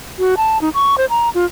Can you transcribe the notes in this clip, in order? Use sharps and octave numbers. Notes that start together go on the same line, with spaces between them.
F#4
A5
D#4
C#6
C5
A#5
F4